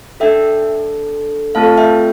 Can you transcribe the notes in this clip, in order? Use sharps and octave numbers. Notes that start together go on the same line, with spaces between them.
D4 A4 E5 G5
A3 C4 F4 A4 F5 A5
E5 G5